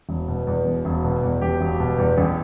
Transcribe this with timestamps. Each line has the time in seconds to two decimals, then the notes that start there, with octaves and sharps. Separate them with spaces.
0.09 E1
0.28 B2
0.47 E2
0.65 E1
0.85 E1
1.04 B2
1.23 E2
1.41 E1 G4
1.61 E1
1.80 B2
1.98 E2
2.18 A1